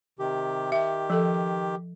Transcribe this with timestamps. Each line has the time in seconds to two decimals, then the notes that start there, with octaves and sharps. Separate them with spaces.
0.19 C3 D#3 G4
0.72 D#3 G4 E5
1.10 F3 A4